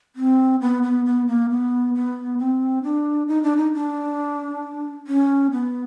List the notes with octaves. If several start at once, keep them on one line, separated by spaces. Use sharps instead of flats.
C4
B3
B3
B3
A#3
B3
B3
C4
D4
D#4
D4
D#4
D4
C#4
B3